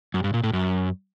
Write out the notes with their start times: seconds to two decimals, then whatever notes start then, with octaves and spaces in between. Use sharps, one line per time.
0.14 F#2
0.24 G2
0.34 A#2
0.44 A2
0.53 F#2